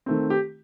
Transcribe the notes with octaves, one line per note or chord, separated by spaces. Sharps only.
D#3 A3 C4
G4